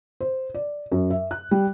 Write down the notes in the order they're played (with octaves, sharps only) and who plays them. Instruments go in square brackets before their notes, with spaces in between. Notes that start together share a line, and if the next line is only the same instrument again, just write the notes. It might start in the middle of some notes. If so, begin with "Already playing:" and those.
[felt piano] C5
D5
F#2
E5
F#6
G3